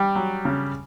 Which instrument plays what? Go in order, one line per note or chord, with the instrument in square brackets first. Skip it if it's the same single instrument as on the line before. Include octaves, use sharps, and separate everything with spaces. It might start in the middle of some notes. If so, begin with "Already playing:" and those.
Already playing: [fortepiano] G3 G4
F#3
C#3